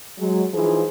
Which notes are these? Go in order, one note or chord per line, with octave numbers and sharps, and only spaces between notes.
F#3 G#3
E3 F3 D#4 F4 G#4 C5